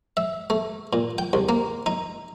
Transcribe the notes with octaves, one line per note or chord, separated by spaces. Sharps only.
E5
A3
A#2
G5
C2
A#3
D#4